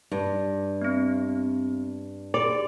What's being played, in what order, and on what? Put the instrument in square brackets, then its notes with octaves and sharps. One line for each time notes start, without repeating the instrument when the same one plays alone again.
[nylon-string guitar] G2
[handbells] B3 C4
[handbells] G4 G#4 [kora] D5